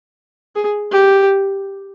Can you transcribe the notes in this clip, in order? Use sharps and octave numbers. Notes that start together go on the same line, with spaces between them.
G#4
G4